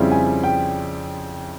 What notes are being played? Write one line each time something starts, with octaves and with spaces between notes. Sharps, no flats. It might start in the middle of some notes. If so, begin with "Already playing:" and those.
Already playing: F2 C#3 G3 C4 E4
G#5
G5